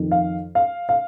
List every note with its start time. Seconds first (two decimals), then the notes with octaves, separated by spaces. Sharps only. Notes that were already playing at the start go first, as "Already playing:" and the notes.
Already playing: F2 D#3
0.12 F5
0.55 F5
0.89 F5